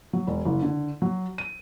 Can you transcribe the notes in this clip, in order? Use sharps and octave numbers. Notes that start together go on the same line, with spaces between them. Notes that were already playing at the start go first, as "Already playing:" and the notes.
F#3
E1
F#1
D3
F#3
D#7